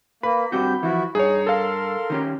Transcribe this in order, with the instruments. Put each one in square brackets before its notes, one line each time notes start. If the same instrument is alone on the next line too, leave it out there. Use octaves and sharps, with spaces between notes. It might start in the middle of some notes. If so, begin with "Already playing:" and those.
[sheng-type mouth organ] A#3 [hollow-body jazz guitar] B4 [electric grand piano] B5
[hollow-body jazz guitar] G2 C4 F#4 [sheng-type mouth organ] G4 G6
[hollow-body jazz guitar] E3 F3 [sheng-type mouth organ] E4 F#4
[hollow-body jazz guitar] G2 [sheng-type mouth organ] D#4 [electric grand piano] G#4 C#5
[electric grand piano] A4 F5 [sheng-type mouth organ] A#4 C6
[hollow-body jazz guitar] D#3 C#4 G4